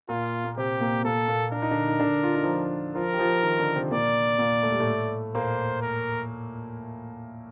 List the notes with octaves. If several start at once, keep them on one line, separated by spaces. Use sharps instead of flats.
A#2 A#3 F4
A#3
C3 C4 G4
A#2 A#3
A#2 A#3 A4
A#2 A#3
D4 A#4
D#4
D3 D4
D#4
D3 D4
F4
D#4
F3 F4
F3 F4 A#4
G4
F3 F4
D#3 D#4
D3 D4
C3 C4
A#2 A#3 D5
A#2 A#3
A3
G3
A2 A3
A#2 A#3 C5
A#4